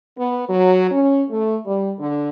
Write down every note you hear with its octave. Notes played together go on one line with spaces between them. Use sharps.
B3
F#3
C#4
A3
G3
D3